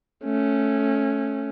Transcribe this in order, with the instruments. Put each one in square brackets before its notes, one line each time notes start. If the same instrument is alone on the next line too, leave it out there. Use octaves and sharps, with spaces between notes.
[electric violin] A3 C#4